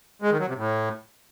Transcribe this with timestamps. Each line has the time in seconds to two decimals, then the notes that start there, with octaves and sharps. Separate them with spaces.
0.22 G#3
0.31 D#3
0.39 F#3
0.48 C3
0.57 A2